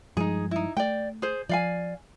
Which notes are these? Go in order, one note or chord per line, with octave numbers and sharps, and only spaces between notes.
G2 F3 G#3 D#4 G#4
D#4 E4
A3 D5 G5
G#4 C5
F3 D5 F5 G#5